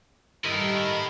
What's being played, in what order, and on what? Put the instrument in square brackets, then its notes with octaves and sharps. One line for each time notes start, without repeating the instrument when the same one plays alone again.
[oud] G2 [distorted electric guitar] A3 E4 [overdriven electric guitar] A#4 D#5